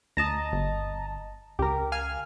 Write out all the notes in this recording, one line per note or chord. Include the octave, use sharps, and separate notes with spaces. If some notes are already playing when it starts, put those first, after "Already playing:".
D2 D#5 A5 A#5
G1
C#2 G4 A#4
F5 G#5 F6